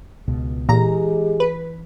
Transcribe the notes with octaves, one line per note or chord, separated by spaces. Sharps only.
C#2 B2
A#2 E3 G#3 G4 G#4 A#5
B4